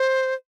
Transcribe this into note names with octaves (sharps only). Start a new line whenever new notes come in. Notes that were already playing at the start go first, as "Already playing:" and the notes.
Already playing: C5